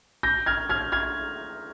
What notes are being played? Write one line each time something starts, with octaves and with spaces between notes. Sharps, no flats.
G6 A#6
F6 G#6
F6 G#6
F6 G#6